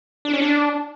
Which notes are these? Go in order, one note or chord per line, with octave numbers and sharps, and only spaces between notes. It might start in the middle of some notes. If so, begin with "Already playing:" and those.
D4
C#4
D4